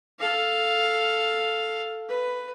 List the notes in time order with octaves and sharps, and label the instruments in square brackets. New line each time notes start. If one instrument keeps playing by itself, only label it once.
[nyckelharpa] A4 F5
B4